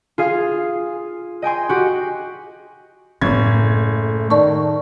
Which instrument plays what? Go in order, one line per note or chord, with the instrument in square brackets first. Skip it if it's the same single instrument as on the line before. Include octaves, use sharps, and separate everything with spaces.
[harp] F4 G#4 F5
D#5 G5 G#5 C6
F#4 G4
[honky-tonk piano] F#1 G#6 [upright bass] A2
[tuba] A3
[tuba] D#3 [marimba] D5 A5 C#6